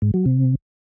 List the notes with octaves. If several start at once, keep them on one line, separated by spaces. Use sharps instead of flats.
G#2
F#3
C3